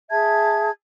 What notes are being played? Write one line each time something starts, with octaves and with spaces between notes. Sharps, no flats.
G#4 E5 A5 G#6